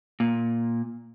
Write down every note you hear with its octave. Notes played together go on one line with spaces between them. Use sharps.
A#2